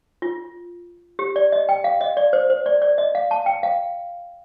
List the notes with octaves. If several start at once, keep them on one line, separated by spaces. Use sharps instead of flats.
F4
G4
D5
D#5
G5
F5
D#5
D5
C5
C5
D5
D5
D#5
F5
A5
G5
F5